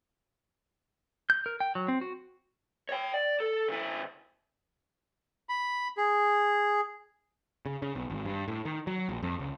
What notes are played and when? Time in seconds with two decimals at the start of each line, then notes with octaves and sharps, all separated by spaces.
1.30 G6
1.46 A#4
1.60 G5
1.75 F#3
1.88 C4
2.01 F#4
2.89 C#5 G5
3.14 D5
3.40 A4
3.68 C#3 E4
5.49 B5
5.97 G#4
7.66 C#3
7.82 C#3
7.95 B1
8.10 G#1
8.25 G2
8.48 A2
8.65 D#3
8.87 F#3
9.09 A#1
9.22 F2
9.39 C#2